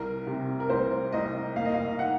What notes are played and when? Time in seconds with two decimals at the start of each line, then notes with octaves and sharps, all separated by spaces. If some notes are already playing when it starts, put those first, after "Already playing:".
Already playing: C2 A#4
0.27 C3
0.60 A#4
0.69 C2 C5
1.12 C2 D#5
1.56 A#3 F5
1.65 D#5
1.74 F5
1.99 D#4 F#5